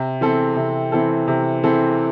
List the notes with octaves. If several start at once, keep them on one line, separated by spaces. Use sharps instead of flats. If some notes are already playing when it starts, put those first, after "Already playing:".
Already playing: C3
E3 C4 A4
C3
E3 C4 A4
C3
E3 C4 A4